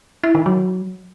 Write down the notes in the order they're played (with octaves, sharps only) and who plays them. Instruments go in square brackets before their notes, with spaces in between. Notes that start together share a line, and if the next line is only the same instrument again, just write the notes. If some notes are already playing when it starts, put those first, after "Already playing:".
[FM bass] E4
D#3
F#3